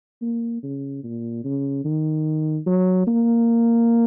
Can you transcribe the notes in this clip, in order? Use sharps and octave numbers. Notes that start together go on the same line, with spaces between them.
A#3
C#3
A#2
C#3
D#3
F#3
A#3